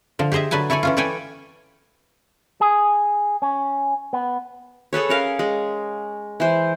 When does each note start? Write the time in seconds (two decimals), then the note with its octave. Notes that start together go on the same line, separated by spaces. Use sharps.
0.19 D3 F3
0.32 G4 G#4 C5 D#5 E5
0.51 D3 F#3 B4 G#5 A5
0.70 E4 A4 C#5 D5 G#5
0.83 E3 C#4 F4
0.97 A4 B4 C#5 D5 G5 G#5
2.61 G#4
3.42 C#4
4.13 B3
4.93 G#4 A4 B4 C#5
5.09 C#4 A#4 F5
5.39 G#3
6.40 E3 C5